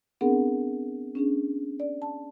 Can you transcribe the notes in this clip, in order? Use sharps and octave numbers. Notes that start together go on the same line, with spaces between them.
B3 C4 D4 G#4 A#4 F#5
C#4 D4 G#4
D5
A5